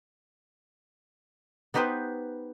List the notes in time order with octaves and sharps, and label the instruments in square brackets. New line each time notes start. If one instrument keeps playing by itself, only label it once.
[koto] B3 D#4 G4 B4 C5